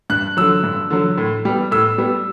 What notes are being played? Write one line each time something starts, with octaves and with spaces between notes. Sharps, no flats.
G2 F#6
D3 F#3 E6
G2
D3 F#3
A2
G3 B3
A2 E6
G3 B3